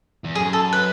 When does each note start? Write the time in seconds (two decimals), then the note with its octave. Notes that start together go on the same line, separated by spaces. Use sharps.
0.24 E2
0.35 F#2 G#4
0.53 A4
0.73 B4